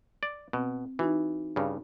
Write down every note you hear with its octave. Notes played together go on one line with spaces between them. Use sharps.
D5
B2 C4
E3 D#4 F#4
G2 C#3